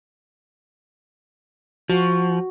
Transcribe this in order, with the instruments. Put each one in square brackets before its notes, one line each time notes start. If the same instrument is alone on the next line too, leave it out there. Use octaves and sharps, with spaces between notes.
[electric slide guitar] F3 [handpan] F#4